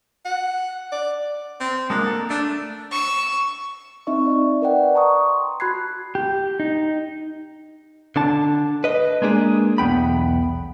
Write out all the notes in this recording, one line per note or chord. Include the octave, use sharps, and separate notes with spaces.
F#5
D5
C4
G#3 A#3 D4 F#4
A4
A3 D4
C#6 E6
C4 D#4 D#5 E5 C#6
D5 E5
A#4 B4 D5 D#5 F#5 G5
A5 A#5 C#6 D#6
C6
F#4 B5 F#6 G#6 C7
G4
D#4
D3 D4 A5
B4 D#5
G#3 A#3 D4 G#4
B1 E2 B3 G5 B5